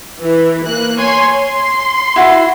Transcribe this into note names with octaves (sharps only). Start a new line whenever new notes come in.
E3
A#3 F#6
C#5 G#5 C6
C6
E4 F#4